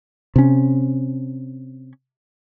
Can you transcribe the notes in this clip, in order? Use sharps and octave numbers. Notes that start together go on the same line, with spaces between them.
C3 C#4